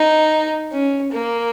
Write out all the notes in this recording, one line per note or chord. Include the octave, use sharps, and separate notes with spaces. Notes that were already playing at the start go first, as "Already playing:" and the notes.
Already playing: D#4
C#4
A#3